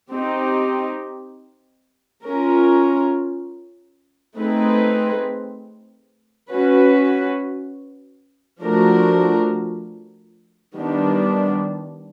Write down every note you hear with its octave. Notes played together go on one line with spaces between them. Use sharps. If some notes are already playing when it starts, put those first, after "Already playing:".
C4 D#4 G4
C#4 F4 A#4
A3 C4 D#4 G#4 B4
C#4 F#4 B4
F3 A3 D4 F#4 A#4
D#3 G3 B3 D4